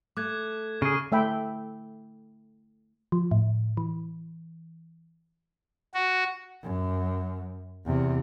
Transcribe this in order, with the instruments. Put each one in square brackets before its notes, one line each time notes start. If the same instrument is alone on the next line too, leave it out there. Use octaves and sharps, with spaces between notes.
[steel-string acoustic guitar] A3 [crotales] D6 F#6 G#6
[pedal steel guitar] C#3 G#4 [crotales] C#6 F6 D#7
[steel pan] A3 E5 G5 B5
[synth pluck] F3
A2
E3
[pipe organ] F#4
[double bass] F#2
E2 C3